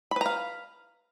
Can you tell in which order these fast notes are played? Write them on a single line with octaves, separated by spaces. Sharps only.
B5 B4 A#5 F5